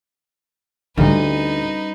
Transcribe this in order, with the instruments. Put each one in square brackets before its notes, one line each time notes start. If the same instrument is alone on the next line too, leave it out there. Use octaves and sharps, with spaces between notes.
[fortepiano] D2 [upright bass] G3 C#4 [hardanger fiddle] D#4 B4